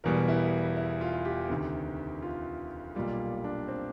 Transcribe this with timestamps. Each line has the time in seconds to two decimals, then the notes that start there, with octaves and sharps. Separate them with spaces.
0.04 E1 E2 B2 G3 A#4
0.28 E4
0.77 E4
1.01 F4
1.25 G4
1.50 D2 C3 D#3
2.22 F4
2.95 B1 A#2 G3 A#3 F4
3.44 D4
3.68 C4